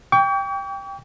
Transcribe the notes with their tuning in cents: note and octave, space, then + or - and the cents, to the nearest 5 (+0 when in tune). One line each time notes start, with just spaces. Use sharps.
G5 +10 C#6 +45